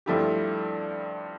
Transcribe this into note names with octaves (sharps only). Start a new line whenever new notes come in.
G2 F3 A3 E4 G4